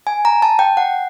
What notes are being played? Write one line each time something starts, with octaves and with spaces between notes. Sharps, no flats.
G#5
A#5
A5
G5
F#5